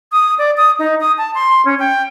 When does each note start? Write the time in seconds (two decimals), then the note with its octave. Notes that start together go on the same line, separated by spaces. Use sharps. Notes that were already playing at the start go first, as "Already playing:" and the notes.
0.12 D#6
0.38 D5
0.57 D#6
0.79 D#4
1.00 D#6
1.18 A5
1.35 C6
1.65 C#4
1.79 G5